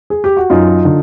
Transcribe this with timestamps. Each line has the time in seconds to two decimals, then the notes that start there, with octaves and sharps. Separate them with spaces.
0.10 G#4
0.24 G4
0.37 F#4
0.50 F#2 D#4 F4
0.85 D3